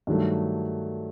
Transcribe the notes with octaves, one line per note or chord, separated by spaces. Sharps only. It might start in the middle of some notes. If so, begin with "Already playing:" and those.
G2 D#3 F#3 A3